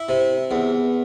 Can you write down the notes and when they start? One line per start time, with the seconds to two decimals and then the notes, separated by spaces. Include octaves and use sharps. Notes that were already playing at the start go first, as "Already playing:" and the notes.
Already playing: E4
0.09 C3
0.51 E2